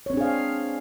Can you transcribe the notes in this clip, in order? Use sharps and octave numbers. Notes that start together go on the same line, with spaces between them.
C4 D4 G#4 C#5 F5